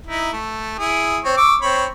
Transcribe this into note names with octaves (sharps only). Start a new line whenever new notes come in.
D#4 E4
A3
E4 G#4
C4 C#5
C#6 D6 E6
C4 C#5 B5